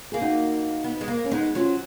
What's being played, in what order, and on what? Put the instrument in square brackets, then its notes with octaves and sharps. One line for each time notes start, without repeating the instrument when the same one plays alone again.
[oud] A#3 [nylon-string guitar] G#4
[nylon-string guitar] D#4 F#4
[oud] B3
G#3
A#3
[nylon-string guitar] C#4
[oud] G#3 [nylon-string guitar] B3 D#4
[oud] F#3 [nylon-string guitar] C#4 F4